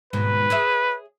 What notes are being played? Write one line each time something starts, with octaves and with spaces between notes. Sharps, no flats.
D#2 G#2 B2 B4
G#4 C#5 E5